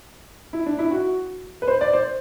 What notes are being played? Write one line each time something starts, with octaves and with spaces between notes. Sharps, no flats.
E4
D4
E4
F#4
B4
C5
D5
C5